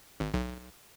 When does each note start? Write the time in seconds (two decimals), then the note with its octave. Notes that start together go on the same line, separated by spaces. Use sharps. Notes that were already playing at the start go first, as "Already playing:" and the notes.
0.20 G#1
0.34 B1